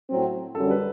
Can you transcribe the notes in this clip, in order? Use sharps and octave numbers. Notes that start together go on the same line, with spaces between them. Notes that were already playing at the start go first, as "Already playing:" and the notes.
A2 F#3 C4
F#2 D3 G3 A4
B4